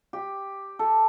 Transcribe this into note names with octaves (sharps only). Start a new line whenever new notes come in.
G4
A4